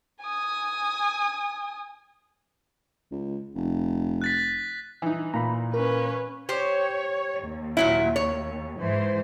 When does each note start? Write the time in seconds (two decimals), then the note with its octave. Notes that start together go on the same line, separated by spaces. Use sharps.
0.21 G#5 D#6
3.11 C#2
3.55 F1
4.22 F#6 A6 B6
5.02 E3 D#4
5.34 A#2 A#5 B5
5.74 C#4 A#4 B4
6.49 G4 C5 C#5
7.42 D#2
7.77 A#2 F#3 E4
8.16 C#5
8.78 G#2 E3 C5